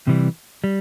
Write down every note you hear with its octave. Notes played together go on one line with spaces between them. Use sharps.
C3 E3 G3
G3